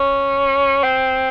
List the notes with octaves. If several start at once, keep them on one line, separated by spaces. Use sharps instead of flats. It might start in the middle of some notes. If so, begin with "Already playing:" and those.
Already playing: C#4
C4